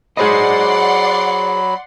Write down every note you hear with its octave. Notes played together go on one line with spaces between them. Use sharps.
F#3 G#4 C5 D5 D#5 F#5 B5 C6